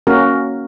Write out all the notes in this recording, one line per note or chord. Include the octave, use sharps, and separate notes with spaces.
A#3 C#4 F#4 A#4